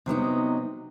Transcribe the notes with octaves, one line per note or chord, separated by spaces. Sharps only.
C3 F#3 B3 D#4